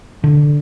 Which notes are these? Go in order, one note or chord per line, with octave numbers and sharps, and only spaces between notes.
D3